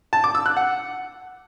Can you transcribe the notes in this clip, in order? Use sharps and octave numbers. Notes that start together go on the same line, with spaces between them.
A5
D6
E6
F#6
F#5